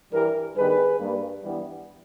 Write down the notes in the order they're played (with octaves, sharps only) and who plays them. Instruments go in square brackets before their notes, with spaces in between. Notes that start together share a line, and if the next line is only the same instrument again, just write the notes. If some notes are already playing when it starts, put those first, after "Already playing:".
[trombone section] G2 E3 G3 G4 A#4
G2 D#3 G3 B3 G#4 B4
G2 G3 A#3
G2 E3 G3 B3